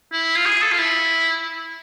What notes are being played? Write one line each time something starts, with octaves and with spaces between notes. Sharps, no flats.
E4
F4
G#4
A4
F4
E4